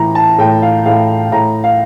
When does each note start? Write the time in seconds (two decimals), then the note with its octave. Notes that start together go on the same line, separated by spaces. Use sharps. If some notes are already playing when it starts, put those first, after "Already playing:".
Already playing: A2 E3 A#5
0.15 A5
0.39 A2 G5
0.62 F5
0.86 A2 F5
1.32 A2 A#5
1.64 F5